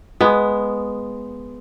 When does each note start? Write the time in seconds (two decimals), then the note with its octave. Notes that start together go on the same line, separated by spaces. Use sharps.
0.21 G#3 B3